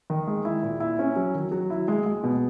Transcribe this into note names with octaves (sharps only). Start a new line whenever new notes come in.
D#3
G#3
E4
A#2
E4
C#4
F#3
D#3
F#3
E4
G#3
G#3
B2